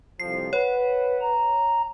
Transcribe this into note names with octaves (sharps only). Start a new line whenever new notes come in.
C2 F2 F3 C7
B4 C#5 F#5
A#5